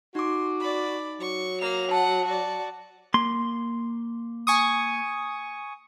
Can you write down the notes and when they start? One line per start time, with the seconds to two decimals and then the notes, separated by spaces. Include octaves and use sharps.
0.15 D#4 F#4 C6 D6
0.60 D5 B5
1.21 F#3 C#6
1.61 A#3 F7
1.91 F#5 A5
2.25 F#4 D5
3.14 A#3 C6
4.47 G#5 C#6 D#6